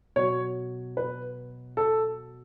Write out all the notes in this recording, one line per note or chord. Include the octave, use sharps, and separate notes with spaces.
B2 F#3 C#5
B4
A4